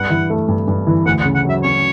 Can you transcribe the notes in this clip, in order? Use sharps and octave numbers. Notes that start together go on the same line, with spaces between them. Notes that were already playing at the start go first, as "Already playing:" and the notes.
Already playing: G2 F#5
E3
A3
G2
G2
E3
D2 F#5
F#5
C#3
F#5
F#3 E5
C#4 C#5